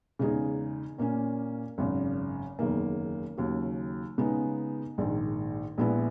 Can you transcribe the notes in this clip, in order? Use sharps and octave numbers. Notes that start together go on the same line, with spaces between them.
E2 C#3 G#3 D#4 G#4
A#2 A#3 C#4
G#1 F#2 C#3
F#1 E2 D#3 A#3
D#2 C#3 F#3
C#3 G#3 B3 D#4
A#1 G#2 D#3
A#1 A#2 G#3 B3 E4